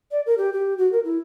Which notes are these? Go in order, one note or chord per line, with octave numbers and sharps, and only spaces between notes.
D5
A#4
G4
G4
F#4
A#4
E4